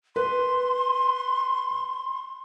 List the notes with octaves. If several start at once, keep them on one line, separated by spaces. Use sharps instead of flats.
B4 C6